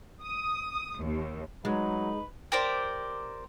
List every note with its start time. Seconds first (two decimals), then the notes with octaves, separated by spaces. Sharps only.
0.22 D#6
1.00 D#2
1.65 F#3 G#3 D#4 B4
2.52 G4 A#4 C5 D5